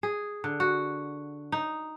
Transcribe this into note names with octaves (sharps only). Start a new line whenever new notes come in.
G#4
D3
F#4
D#4